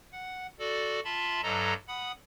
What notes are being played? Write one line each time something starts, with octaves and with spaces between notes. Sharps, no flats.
F#5
F#4 A4 D5
F4 E5 A5 B5 C6
G2 F#3 A4 D#5 A#5
F#5 B5 D#6